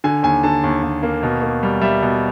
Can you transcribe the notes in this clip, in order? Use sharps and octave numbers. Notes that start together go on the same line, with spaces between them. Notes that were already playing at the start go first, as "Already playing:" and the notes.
D3 G#5
D#2 G#5
D3 A5
D#2
D#2
A#3
B2
A#3
G3
G3 E5
B2